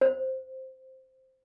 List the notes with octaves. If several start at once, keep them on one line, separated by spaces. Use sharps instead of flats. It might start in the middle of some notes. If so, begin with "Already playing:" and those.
C5